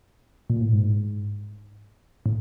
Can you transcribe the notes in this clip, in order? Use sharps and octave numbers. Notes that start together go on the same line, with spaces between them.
A#2
A2
G#2
A2